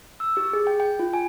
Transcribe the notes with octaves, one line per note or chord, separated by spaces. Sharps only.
E6
G4
G#4
G5
G5
F4
G#5